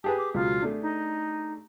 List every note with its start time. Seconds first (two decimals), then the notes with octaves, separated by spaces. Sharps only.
0.04 G4 G#4 B4 A5
0.18 D6
0.34 C#2 B2 F#3 F4
0.62 A3 D4
0.82 D#4